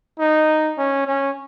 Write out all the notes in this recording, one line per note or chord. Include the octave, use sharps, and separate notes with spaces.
D#4
C#4
C#4